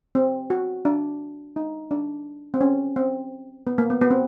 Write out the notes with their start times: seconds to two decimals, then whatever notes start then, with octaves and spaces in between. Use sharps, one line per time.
0.15 C4
0.50 F#4
0.85 D4
1.56 D#4
1.91 D4
2.54 C4
2.61 C#4
2.96 C4
3.67 B3
3.78 A#3
3.90 B3
4.01 B3
4.11 C4